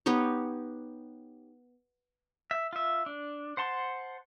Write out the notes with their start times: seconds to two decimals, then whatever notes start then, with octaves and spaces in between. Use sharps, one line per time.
0.06 B3 D#4 G4 C#5
2.51 E5
2.73 F4 E5
3.06 D4
3.57 C5 F#5 A5 C6